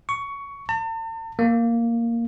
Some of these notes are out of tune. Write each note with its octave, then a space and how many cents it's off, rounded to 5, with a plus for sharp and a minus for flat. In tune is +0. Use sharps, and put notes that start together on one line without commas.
C#6 +15
A5 +45
A#3 -5